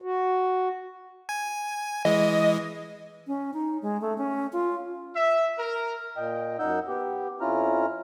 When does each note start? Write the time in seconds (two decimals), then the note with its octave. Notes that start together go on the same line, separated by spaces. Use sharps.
0.02 F#4
1.29 G#5
2.05 E3 G#3 D#5
3.27 C#4
3.54 D#4
3.82 G#3
4.01 A3
4.18 C#4
4.53 F4
5.16 E5
5.58 A#4
6.17 A#2 D#5 G5
6.59 F#2 D#4 F#5 E6 G6
6.88 B3 G4
7.41 F2 C#4 E4 F4 A#5 F6